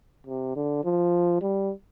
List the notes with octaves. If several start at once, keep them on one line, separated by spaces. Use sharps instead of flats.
C3
D3
F3
G3